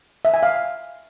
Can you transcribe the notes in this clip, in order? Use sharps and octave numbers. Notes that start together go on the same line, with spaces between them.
E5
G#5
F5